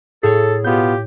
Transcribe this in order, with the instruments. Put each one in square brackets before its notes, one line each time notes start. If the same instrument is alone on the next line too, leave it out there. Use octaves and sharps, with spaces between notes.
[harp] A2 C#5 [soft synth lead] G#4 [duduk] A4
[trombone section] B2 B3 F4 [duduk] G4 [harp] G6